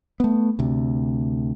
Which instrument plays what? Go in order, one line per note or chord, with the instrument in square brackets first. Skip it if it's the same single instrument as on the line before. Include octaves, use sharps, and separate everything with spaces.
[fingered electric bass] A3 B3
D2 C3